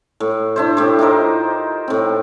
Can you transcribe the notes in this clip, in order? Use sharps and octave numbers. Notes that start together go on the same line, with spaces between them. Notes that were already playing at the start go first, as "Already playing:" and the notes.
A2
D4 E4 C5
A2 G4 C5
D#4 F4 A#4 C5
A2 C4